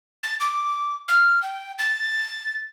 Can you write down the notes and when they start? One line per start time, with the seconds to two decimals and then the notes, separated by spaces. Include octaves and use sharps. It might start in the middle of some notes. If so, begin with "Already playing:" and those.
0.23 A6
0.40 D6
1.08 F6
1.42 G5
1.79 A6